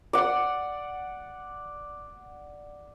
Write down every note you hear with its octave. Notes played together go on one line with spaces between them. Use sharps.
D5 F#5